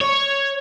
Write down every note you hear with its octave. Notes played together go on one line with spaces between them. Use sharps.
C#5